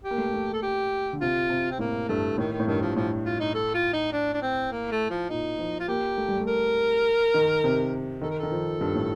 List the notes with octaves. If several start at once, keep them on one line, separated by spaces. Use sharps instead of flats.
G4
A#3
A3
A#3
A3
A4
G4
D3
C3 F4
C3
C4
A2 A#3
G2 A3
A2 D#3
D#3
A2
G2 D#3
F3
A2 F3
F4
D#4
A4
F4
D#4
D4
D4
C4
A#3
A3
F3
A#2 D#4
F3
F4
A#3 G4
A3
G3
A3
A#4
D#3
C3
D#3 A4
A#4
D#3 A4
F3
G2
A2